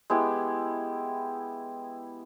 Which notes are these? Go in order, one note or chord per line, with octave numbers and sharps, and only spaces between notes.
G#3 B3 E4 G4